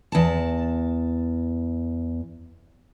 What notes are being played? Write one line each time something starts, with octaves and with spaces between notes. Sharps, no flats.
E2 A5